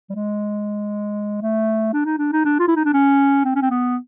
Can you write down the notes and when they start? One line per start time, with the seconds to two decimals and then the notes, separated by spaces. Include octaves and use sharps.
0.10 G3
0.15 G#3
1.42 A3
1.93 D4
2.05 D#4
2.19 D4
2.33 D#4
2.45 D4
2.60 F4
2.68 E4
2.76 D#4
2.85 D4
2.94 C#4
3.45 C4
3.55 C#4
3.62 C4
3.70 B3